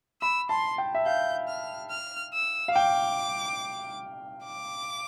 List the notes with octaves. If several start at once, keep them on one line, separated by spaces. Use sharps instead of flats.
B5 E6
A5 C6
G5
E5
F5 G6
F6
F6
E6
F5
G5 D6
D6